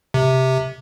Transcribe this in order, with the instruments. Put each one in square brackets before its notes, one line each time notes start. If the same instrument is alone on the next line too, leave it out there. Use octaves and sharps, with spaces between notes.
[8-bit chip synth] C3